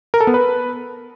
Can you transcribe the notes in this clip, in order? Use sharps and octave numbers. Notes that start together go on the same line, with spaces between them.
A#4
A4
B3
B4